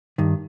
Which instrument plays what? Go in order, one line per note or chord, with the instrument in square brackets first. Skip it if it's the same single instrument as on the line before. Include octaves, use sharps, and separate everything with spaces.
[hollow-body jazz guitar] G2 D#3